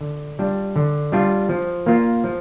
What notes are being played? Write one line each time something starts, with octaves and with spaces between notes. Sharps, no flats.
D3
G3 D4 F4
D3
G3 D4 F4
F3
A#3 F4
F3